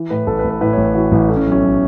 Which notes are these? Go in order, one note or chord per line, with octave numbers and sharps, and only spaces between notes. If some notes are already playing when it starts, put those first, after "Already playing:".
Already playing: E3
A2 B4
A1 A4
B4
A1
B4
A2 B4
C#5
A1
B4
E3 F#4
A1 E4
A3 E4
C#4
B1
C#4
B1